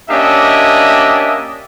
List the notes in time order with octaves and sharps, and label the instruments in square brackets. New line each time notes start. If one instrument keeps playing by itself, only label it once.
[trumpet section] A#3 C#4 D4 G4 D#5 E5